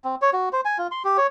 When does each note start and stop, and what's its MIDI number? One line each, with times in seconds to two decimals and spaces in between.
0.04 0.15 60
0.22 0.30 73
0.33 0.49 66
0.53 0.61 72
0.65 0.78 80
0.78 0.87 65
0.91 1.03 84
1.04 1.17 67
1.17 1.27 73